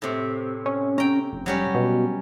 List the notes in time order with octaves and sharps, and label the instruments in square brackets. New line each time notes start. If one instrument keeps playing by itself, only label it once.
[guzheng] A2 C3
[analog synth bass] C#4
[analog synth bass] C#4 [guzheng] G5 A#5
[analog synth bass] F1
[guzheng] F#3 G3 C#4
[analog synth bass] B2